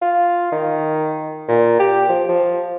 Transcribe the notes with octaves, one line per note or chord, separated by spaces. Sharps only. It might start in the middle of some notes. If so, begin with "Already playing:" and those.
F4
D#3
A#2
G4
F3
F3